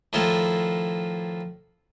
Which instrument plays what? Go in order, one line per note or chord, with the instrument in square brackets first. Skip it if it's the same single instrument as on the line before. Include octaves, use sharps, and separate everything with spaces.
[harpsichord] A2 D#3 F3 E4 F4 A4